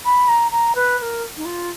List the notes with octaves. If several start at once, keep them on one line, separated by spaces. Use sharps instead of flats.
B5
A#5
A#5
B4
B4
A#4
D#4
F4